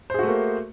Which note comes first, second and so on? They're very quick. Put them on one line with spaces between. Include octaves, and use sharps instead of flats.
C5 G#4 F#4 A3 A#3